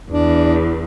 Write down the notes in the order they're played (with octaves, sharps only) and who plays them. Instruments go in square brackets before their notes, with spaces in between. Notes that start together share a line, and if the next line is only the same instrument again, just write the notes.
[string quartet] E2 [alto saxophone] D4